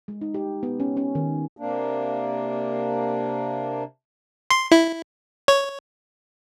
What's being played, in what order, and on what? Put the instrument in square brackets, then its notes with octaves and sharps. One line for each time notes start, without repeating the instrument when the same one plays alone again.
[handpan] G#3
D#4
G4
B3
C#4
C#4
D#3
[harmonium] C3 A#3 D4
[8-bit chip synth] C6
E4
C#5